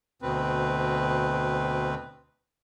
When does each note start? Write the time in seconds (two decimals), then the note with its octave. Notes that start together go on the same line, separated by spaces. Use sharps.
0.22 D2 B2 C4 B4